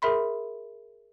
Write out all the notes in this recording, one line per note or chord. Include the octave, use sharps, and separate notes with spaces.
G#4 A#4 E5 B5 C6